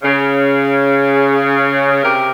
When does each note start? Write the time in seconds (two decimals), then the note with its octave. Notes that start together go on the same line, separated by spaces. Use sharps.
0.03 C#3
2.03 C3 G4 A#4